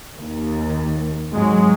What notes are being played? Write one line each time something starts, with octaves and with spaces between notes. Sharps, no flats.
D#2
G#1 F#3 G#3